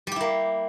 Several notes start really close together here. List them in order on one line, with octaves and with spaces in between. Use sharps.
G3 G4 E4 A#3